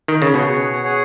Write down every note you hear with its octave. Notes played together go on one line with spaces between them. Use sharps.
D#3
C#3
B2 G#4 C#5 F#5
G#4 C#5 F#5